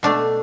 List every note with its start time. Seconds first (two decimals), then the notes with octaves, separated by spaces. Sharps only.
0.03 B2 A3 D4